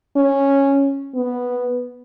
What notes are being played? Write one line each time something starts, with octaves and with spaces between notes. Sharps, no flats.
C#4
B3